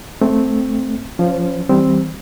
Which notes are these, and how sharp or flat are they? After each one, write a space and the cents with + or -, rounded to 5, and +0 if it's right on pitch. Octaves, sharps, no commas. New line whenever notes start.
A3 +0 C4 +0
F3 +0 C#4 +0 C5 -30
E3 -30 G3 +0 C4 +0